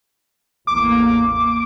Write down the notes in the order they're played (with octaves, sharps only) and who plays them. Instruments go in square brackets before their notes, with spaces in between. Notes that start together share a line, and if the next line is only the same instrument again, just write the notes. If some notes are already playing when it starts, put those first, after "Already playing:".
[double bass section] A1 E2 A#3 [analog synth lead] D6